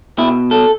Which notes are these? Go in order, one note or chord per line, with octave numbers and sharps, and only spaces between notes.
B2 E4
A4